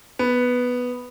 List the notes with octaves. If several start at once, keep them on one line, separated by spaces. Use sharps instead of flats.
B3